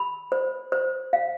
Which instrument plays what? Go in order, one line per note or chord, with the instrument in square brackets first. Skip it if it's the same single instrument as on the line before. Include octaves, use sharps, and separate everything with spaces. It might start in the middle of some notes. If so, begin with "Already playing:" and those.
Already playing: [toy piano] B5
C5
C5
F5